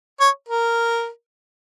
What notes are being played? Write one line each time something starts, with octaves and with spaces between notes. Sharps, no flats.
C#5
A#4